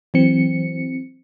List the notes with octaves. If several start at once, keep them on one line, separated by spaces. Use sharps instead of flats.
E3 F#3 C4 C#7